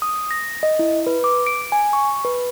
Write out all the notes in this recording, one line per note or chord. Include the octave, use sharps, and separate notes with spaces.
D#6
A#6
D#5
E4
B4
D6
D7
G#5
C#6
B4